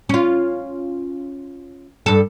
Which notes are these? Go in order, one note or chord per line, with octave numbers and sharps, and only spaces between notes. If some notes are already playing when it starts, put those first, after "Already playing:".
C#4 F4
G2 A4